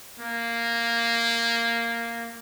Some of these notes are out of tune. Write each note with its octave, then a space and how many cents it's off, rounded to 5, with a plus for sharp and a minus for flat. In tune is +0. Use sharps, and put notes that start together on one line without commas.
A#3 -5